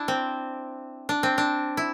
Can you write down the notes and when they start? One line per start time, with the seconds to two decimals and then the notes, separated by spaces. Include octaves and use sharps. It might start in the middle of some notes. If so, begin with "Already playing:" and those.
Already playing: D4 E4
0.08 C4
1.09 D4
1.23 C4
1.38 D4
1.77 E4